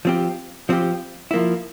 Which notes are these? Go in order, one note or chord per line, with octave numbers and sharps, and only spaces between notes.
F3 C4 G4
F3 C4 G4
F3 A#3 E4